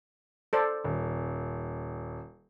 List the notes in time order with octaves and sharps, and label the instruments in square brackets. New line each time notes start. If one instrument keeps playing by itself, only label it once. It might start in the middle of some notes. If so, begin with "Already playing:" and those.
[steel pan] A4 C5 D5
[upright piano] D#1